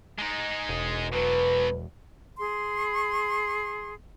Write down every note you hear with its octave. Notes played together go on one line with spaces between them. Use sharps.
G#3 D#4
E1
B2 F#3 B4
G#4 C6